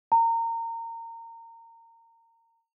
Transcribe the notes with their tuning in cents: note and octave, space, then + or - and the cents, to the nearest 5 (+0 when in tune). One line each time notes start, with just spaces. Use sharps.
A#5 -25